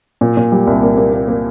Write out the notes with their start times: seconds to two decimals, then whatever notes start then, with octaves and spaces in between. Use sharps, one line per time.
0.21 A#2
0.37 A#2
0.52 G3
0.67 C2
0.83 A#3
0.98 A#3
1.13 A#3
1.28 A#3